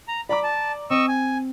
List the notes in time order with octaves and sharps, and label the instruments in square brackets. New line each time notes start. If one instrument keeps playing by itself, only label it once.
[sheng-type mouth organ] A#5
[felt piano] D5 A#5 D6 [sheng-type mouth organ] B5
[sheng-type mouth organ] A5
[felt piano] C4 [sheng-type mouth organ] D#5 C#6 E6
[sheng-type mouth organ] G#5